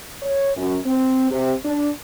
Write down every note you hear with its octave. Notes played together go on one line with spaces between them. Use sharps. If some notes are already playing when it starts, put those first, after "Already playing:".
C#5
F#2
C4
C3
D4